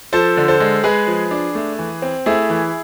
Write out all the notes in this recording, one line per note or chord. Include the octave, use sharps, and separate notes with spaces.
F3 A4 C5
D3
A4 C5
G#3
G#3 G#4 B4
F3
D4
A3
E3
C4
A3 E4 G#4
E3